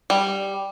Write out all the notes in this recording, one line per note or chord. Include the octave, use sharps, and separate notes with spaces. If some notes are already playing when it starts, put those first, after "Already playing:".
G3